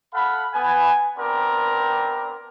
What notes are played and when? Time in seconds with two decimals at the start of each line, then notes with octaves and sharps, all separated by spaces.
0.14 A4 F5 F#5 B5
0.54 B3 B4 G#5
1.18 B3 C4 D4 G4 A#4